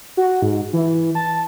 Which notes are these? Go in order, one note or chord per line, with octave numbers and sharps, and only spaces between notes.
F#4
G#2
E3
A5